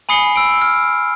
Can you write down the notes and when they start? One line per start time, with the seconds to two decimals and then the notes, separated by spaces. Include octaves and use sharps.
0.09 G#5 B5 D#6 C7 C#7 G7
0.36 E6 D7
0.62 F6